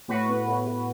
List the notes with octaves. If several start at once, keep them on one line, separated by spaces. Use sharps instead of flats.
A2 F#4 B4
B3
A2
A2